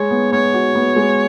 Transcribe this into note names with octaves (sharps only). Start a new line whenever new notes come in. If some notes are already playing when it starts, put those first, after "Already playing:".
Already playing: G#3 C#5
B3
B3 C#5
F#4
B3
G#3